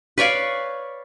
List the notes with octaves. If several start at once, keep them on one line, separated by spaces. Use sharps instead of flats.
B4 C#5 D5 F5